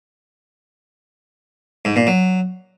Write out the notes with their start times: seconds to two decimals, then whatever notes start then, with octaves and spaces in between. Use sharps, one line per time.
1.85 G#2
1.96 A#2
2.07 F#3